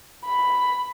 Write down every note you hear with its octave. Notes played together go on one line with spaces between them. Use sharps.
B5